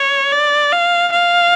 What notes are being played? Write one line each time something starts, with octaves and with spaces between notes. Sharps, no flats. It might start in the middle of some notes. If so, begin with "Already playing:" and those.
Already playing: C#5
D5
F5
F5